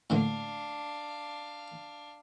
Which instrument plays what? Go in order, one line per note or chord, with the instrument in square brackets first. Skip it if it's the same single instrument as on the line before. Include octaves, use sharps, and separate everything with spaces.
[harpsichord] A2 D3 A#3 [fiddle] D4 F5